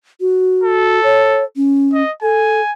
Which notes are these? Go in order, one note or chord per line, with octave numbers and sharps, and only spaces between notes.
F#4
A4
C#5
C#4
D#5
A4 G#5